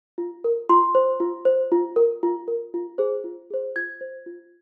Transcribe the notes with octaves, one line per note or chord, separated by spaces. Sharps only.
F4
A#4
F4 C6
C5
F4
C5
F4
A#4
F4
A#4
F4
G#4 C5
F4
G#4 C5
F4 G#6
C5
F4